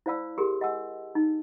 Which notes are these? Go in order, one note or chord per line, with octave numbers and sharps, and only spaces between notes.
E4 C5 D5 F5 B5 E6
G4 G#4 A#4 C6
D#5 F#5 G#5 E6
D#4